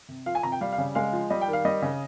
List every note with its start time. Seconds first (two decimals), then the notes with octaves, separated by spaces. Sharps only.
0.09 C3
0.26 F3 F5
0.35 G#5
0.43 C3 A#5
0.52 G5
0.61 G3 F5
0.73 F5
0.78 C#3
0.95 G#3 F5
1.13 F3
1.30 G3 D#5
1.42 G5
1.48 D#3
1.53 F5
1.65 G3 D#5
1.82 C#3